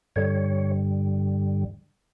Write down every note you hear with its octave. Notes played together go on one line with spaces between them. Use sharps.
G2 D3 G3 C#5